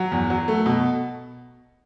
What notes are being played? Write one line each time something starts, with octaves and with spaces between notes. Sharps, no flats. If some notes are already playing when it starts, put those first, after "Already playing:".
Already playing: F#3
E2
F#3
A3
B2